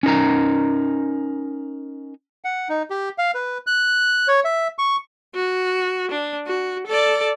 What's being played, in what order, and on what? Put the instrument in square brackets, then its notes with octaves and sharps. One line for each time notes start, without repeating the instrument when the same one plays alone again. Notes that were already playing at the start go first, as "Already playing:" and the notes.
[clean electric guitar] C#4 D#4 A#4 A#5
[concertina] F#5
D#4
G4
F5
B4
F#6
C#5
E5
C#6
[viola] F#4
D4
F#4
A4 D5